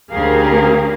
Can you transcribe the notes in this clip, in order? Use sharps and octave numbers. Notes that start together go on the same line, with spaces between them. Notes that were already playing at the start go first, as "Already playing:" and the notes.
D2 C#4 G4 G#4 A#4 F5